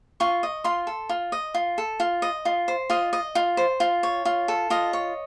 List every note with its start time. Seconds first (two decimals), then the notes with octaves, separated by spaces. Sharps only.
0.20 F4 C#6
0.43 D#5
0.64 F4 C6
0.87 A4
1.09 F4
1.32 D#5
1.54 F4
1.78 A4
2.00 F4
2.22 D#5
2.45 F4
2.68 C5
2.90 F4 D#5
3.13 D#5
3.35 F4
3.57 C5
3.80 F4
4.03 C#5
4.25 F4
4.48 A4
4.70 F4 D#5
4.93 C#5